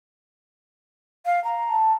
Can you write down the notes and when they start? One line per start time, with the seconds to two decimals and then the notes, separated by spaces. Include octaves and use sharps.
1.26 F5
1.44 A#5
1.69 A5